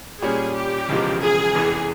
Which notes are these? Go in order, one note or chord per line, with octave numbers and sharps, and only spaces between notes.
A#2 G3 C#4 G#4
G4
E1 E2 C#3 F3 G#3
G#4
F1 E2 E3